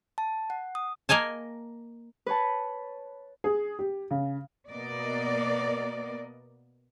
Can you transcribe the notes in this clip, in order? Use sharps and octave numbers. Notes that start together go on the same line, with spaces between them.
A5
F#5
D#6
A#3 A#4 D#5 G#5 A5
B4 C#5 A5
G#4
G4
C#3
B2 A#3 B3 A#4 D5 D#5